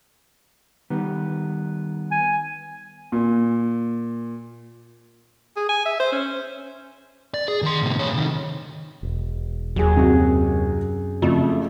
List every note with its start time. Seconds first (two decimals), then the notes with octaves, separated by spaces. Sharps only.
0.90 D#3 G3 B3
2.11 G#5
3.12 A#2
5.56 G#4
5.69 G#5
5.86 E5
6.00 C5
6.12 C#4
7.34 D5
7.48 G#4
7.62 D#3 C6
7.82 A2 C3
7.99 C3 C#5
8.13 C3 D#3
9.03 E1
9.76 D#2 F#3 G#4
9.97 F#2 C3 F#4
11.22 F2 C#3 A3